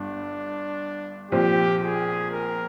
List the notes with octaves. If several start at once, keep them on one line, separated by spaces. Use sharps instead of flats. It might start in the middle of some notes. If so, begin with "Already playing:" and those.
Already playing: G1 G2 D4
A#1 A#2 F3 C4 G4
G#4
A#4